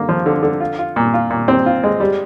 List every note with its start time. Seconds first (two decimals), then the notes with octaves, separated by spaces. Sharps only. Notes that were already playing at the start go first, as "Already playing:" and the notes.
Already playing: D3 A#3
0.09 F3
0.26 D3
0.43 D3
0.60 F4
0.79 F4
0.96 A#2
1.14 F4
1.30 A#2
1.48 C4
1.66 F4
1.84 G#3
2.00 G3